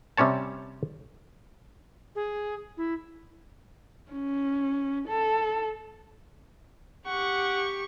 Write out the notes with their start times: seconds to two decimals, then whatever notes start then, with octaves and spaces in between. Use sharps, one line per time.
0.17 C3 G3 C#4 C#5 A5
2.15 G#4
2.77 E4
4.12 C#4
5.08 A4
7.07 G4 F#5 C#6